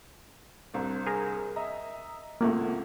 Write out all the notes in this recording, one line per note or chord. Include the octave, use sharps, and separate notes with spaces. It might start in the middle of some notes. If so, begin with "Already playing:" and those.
C2 C4 D4
G#4 A#4
D#5 E5 A#5
G#1 C#2 A3 A#3